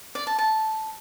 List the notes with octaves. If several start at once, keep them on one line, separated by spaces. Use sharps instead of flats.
D5
A5
A5